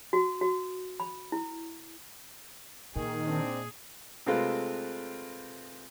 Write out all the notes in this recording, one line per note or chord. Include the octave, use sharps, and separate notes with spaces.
F#4
F#4
B5
E4
A#2 D#3 G#4
C4 D4 D#4
C3 G#3 A3 C4 F4 B4